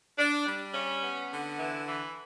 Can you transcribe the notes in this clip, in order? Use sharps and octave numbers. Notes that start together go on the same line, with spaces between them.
D4
G3
C#4
B3
D3
E3
E3